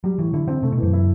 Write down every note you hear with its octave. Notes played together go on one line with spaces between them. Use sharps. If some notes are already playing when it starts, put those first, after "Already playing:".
F#3 G3
A2 E3
D3 E4
D3 C4
C3 A3
B2
F#2 E3
E4